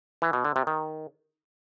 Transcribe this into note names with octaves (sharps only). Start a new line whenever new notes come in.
E3
B2
D3
C3
D#3